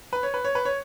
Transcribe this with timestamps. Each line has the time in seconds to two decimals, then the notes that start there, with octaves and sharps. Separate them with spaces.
0.13 B4
0.23 C#5
0.34 B4
0.45 C#5
0.55 B4
0.65 C#5